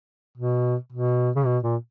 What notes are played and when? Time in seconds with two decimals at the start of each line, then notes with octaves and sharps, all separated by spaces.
0.38 B2
0.92 B2
1.36 C#3
1.46 B2
1.63 A#2